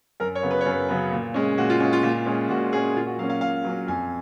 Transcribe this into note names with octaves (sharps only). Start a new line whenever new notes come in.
F#2 A#4
C#5
C#3 F#3 B3
B4
C#5
F#2 B4
C#3 F#3 B3
A#2
G#3 C#4
A#2 F#4
F4
G#3 C#4
F4
A#2
G#3 C#4
A#2 F#4
G#3 C#4 G#4
A#2 F4
F#4
F#3 A#3 C#4 F5
F5
A#2 F5
F#3 A#3 C#4
F2 G#5